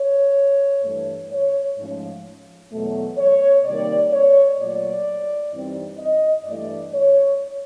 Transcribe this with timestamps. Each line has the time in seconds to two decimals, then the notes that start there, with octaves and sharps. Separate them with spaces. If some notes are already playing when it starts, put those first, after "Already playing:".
Already playing: C#5
0.83 G2 E3 A3
1.31 C#5
1.77 G#2 F3 A3 C#4
2.71 E2 B2 F#3 A3
3.17 C#5
3.64 C3 D#3 G3 A#3 D5
4.12 C#5
4.59 A#2 F#3 A3 D5
5.52 G2 E3 G3 C4 D#4
5.98 D#5
6.45 G2 E3 A3 D4 D5
6.93 C#5